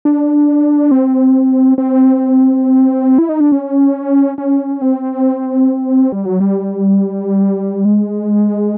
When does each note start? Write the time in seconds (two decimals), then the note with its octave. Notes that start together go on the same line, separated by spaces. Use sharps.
0.05 D4
0.91 C4
1.78 C4
3.18 E4
3.29 D#4
3.40 D4
3.52 C#4
4.38 C#4
4.82 C4
6.12 G3
6.25 F#3
6.40 G3
7.85 G#3